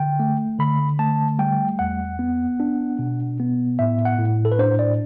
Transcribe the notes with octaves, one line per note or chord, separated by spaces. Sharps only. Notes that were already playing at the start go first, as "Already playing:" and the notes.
Already playing: D3 G5
A3
D3 B5
A3 A5
G3 G5
E2 F#5
B3
D4
B2
B3
A2 E5
F#5
A2
A4
B4
D4 C5
D5